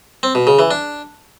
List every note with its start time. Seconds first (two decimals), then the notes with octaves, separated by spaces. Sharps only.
0.23 C4
0.35 B2
0.47 C#3
0.59 E3
0.71 D4